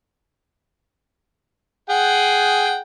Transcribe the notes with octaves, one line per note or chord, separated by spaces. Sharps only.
G#4 F#5 G5